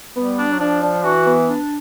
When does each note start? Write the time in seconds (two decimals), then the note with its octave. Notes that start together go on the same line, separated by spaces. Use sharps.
0.16 G3 B3
0.38 D4
0.52 F#3
0.59 F3 D4
0.82 D4
1.03 E3 F#4
1.26 B3
1.48 D4